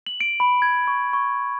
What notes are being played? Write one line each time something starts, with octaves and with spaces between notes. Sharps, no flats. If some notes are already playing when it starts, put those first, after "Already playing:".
F#7
D7
B5
G#6
C#6
C#6